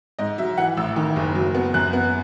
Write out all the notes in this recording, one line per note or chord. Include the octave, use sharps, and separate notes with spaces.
G#2 D#5
F#3 E5
E3 F#5
A1 E6
D#3
F#1
F#3
B3
F#2 F#6
B3